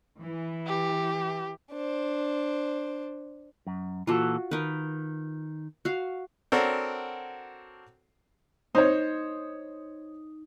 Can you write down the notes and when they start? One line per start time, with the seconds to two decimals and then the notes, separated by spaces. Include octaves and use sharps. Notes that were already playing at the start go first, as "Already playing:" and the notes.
0.22 E3
0.67 G4
1.72 D4 C5
3.67 F#2
4.07 A#2 E3 F4 F#4 A4
4.51 D#3 A#4 B4
5.85 F#4 F5
6.52 C4 D4 F#4 A4 A#4 C#5
8.75 D#4 C5 C#5